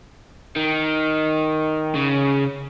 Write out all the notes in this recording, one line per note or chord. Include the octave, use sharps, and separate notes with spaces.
D#3
C#3